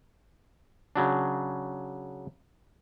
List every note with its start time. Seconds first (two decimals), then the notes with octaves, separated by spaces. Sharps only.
0.96 C#3 F#3 D4